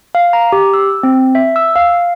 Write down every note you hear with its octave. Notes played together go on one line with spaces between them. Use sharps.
F5
A#5
G4
E6
C4
E5
E6
F5